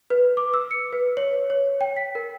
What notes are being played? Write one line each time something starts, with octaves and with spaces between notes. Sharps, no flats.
B4
D6
E6
C#7
B4
C#5
C#5
G5
B6
A#4